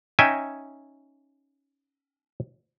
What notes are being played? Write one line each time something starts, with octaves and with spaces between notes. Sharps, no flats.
C#4 D#4 D#5 E5 G5 G#5